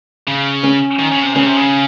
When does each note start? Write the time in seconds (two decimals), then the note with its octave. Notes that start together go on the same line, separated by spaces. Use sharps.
0.28 C#3
0.64 C#4
0.99 D#3
1.12 C#3
1.23 C3
1.35 C#3 C#4
1.46 C3
1.57 C#3